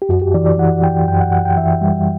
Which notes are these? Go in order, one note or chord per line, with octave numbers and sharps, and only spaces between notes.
G4
F#2 F#4
G4
E3 D5
D5
E3 F#5
E3 G5
F#2 G5
F#5
F#2 F#5
G5
E3 E5
G3